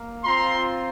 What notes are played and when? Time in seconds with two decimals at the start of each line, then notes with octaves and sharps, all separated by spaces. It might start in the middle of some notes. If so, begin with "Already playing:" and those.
Already playing: A#3
0.24 C4 F4 A#5 C6